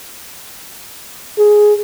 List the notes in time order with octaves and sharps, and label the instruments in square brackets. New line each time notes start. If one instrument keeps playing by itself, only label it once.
[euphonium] G#4